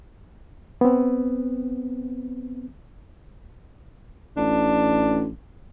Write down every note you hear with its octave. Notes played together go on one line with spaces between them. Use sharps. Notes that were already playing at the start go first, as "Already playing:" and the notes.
B3 C4
A1 D4